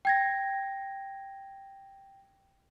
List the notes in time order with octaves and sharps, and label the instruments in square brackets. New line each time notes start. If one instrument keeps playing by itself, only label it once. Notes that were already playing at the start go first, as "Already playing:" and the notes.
[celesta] G5 G#6 A#6